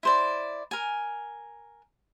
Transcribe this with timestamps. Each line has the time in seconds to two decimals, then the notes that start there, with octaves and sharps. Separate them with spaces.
0.03 E4 C5 D5
0.71 A#4 G#5